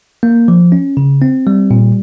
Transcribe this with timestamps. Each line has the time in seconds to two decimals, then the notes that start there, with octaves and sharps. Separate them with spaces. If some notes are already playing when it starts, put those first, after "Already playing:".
0.23 A#3
0.48 F3
0.72 C#4
0.97 C#3
1.22 C4
1.47 G3
1.71 A#2